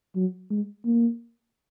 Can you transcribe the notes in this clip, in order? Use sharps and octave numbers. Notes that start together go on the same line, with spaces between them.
F#3
G#3
A#3